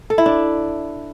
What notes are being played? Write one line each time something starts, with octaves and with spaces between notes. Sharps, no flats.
A4
E4
D4